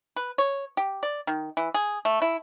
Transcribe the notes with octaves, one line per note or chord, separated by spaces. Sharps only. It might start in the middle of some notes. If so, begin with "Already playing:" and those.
B4
C#5
G4
D5
D#3
E3
G#4
A3
E4